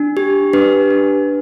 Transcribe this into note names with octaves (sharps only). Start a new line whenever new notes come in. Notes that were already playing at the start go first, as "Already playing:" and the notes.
Already playing: D4
G4
D4 B4
D4